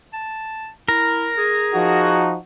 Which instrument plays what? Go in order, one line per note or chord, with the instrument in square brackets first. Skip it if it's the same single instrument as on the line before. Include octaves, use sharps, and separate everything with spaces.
[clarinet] A5
[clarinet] E4 [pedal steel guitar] A#4
[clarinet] G#4
[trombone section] F3 D#4 F#4